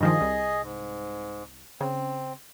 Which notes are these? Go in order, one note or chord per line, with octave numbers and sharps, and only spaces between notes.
G2 D#3 F3 G#4 D#5
C2
G#2
C#3 C4